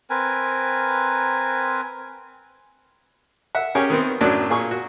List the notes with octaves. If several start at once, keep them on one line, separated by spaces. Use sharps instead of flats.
C4 A#4 B4 G#5
E5 F#5
C#4 G4 G#4 A#4 C#5 G5
D#3 B3 C4
F#2 A2 F#3 D4 D5 F#6
A#2 G#4 C#6
F#4